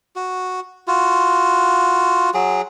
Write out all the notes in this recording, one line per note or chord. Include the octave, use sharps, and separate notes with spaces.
F#4
F4 F#4
F#3 G#4